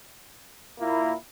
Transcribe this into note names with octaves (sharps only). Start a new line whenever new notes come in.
A#2 A#3 E4